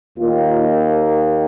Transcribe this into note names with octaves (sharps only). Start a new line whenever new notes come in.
D#2 D#3 A#3 F4
D#4